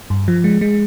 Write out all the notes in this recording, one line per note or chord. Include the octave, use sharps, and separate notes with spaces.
G2
F3
G#3
G#3